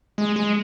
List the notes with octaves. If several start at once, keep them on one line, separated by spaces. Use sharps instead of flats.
G#3
G#3